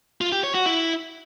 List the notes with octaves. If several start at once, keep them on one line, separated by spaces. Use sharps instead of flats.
F4
G4
C#5
F#4
E4